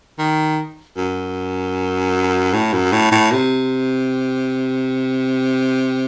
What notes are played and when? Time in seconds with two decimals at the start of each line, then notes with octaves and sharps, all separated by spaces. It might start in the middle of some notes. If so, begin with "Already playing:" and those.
0.18 D#3
0.97 F#2
2.53 A2
2.73 F#2
2.92 A2
3.11 A2
3.32 C3